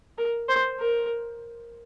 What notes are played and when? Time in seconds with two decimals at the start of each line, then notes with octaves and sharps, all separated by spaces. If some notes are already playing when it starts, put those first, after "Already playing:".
0.18 A#4
0.49 C5
0.80 A#4